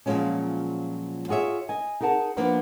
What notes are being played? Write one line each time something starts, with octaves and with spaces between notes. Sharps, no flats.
A#2 F3 F#3 G#3 C#4
F4 F#4 G#4 C#5 E5
D#5 G#5
D#4 G#4 A#4 F#5 A5
F3 A#3 B3 D4 B4